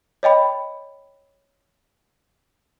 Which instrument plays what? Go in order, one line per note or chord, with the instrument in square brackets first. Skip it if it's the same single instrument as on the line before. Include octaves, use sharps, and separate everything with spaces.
[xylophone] C#5 D#5 G5 B5